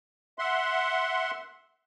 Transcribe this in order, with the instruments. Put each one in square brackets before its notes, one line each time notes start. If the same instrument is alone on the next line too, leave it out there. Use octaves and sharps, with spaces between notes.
[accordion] E5 F#5 C6